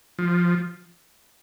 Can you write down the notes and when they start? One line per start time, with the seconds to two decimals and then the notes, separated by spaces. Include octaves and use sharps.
0.19 F3